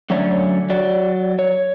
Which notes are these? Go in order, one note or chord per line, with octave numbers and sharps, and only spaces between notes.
D3 F#3 A3 C#4 C#5 D5
F#3 D5
C#5